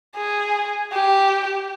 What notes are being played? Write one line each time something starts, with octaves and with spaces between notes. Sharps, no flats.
G#4
G4